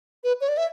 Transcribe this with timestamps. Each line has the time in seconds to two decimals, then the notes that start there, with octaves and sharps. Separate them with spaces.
0.24 B4
0.41 C#5
0.48 D5
0.57 E5